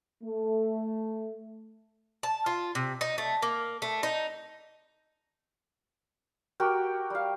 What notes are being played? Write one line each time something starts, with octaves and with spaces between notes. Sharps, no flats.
A3
A5
F4
C3
D#4
A3
A#3
A3
D#4
F#4 G4 A#4 G5
G3 F5